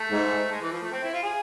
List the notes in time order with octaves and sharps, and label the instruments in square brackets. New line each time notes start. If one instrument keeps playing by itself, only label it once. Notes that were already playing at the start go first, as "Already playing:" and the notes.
Already playing: [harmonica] A3
[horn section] G#2
[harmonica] G#3
E3
F3
A3
C4
E4
F4
G#4